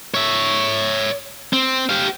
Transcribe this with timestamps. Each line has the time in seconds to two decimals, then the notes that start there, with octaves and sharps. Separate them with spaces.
0.14 C#5 E5
1.53 C4
1.90 G4 F5